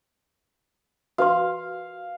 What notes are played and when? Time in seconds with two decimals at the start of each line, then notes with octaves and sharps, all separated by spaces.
1.18 F#4 B4 F5 C6